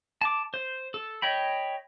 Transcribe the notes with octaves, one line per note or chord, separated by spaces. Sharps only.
A5 D6
C5
A4
C#5 D#5 G5 B5